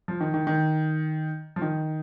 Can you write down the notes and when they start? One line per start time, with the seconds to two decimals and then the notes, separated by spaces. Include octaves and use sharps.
0.08 F3
0.21 D#3
0.34 D#3
0.47 D#3
1.56 F3
1.62 D#3